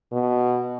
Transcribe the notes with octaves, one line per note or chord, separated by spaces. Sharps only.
B2